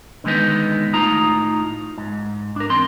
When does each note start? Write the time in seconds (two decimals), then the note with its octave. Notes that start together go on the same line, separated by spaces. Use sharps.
0.24 D3 D#3 G#3 B3 D#4
0.93 A2 D#4 F4 A#5
1.98 G#2
2.56 D4 A#4
2.70 E2 C4 C6